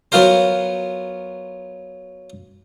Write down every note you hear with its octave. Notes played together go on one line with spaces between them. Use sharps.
F#3 B3 F4 A#4 C5